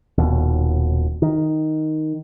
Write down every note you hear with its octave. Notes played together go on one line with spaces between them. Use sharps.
D#1 D#2 B2
D#3